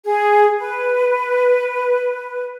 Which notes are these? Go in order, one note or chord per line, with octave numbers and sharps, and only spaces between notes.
G#4
B4